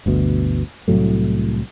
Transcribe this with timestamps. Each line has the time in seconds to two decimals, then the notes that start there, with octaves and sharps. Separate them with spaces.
0.06 G1 D2 B2
0.88 C2 A2 F#3 A3